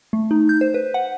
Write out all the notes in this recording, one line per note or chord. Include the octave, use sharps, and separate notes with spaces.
A3
D#4
G6
C5
B4
F#5